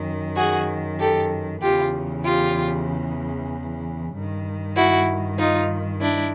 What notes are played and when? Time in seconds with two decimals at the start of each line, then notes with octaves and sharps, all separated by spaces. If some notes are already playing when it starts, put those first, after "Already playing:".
Already playing: F#2 D#3
0.36 F#4 G#4
0.99 G4 A4
1.61 E2 C#3 E3 F4 G4
2.24 F4 G4
4.13 G2 D#3
4.76 E4 F#4
5.38 D#4 F4
6.01 D4 E4